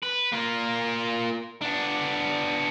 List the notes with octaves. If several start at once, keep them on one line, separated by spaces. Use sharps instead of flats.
B4
A#3 F4
B3 D4